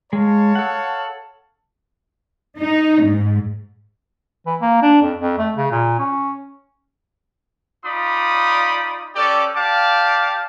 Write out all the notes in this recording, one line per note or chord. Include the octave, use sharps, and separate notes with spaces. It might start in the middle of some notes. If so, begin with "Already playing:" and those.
G#3 C#5 F5 A5
A4 F#5
D#4
G#2
E3
A#3
D4
F2
F2
A3
C#3
A#2
C#4
D#4 F4 D5 B5 D#6
C#4 G4 A4 D5
G4 D5 F5 A5 D6